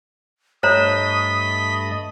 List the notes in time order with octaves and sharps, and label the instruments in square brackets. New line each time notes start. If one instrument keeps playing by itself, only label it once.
[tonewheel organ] G2 A3 D#5 [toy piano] C5 C#5 A#5 [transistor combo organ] B5 [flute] D#6